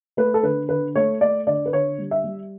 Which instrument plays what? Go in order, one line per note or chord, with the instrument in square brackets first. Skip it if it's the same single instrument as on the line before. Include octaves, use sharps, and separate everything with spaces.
[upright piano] A3 B4
A4
D3 B4
D3 B4
A3 C#5
A3 D5
D3 D5
B4
D3 C#5
G3
E5
G3